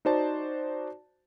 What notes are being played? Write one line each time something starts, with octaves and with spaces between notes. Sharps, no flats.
D#4 F#4 C5 D5 A5